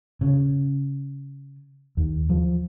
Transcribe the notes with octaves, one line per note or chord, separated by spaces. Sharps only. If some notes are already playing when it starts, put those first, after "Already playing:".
C#3
D#2
F3